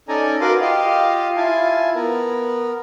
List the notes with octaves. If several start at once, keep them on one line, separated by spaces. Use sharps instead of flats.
C#4 D#4 A4 D5 G#5 A#5
F#4 A#4 B4 F5 C6 D6
F4 G4 D#5 F5
E4 F4 G#5 A5
B3 A#4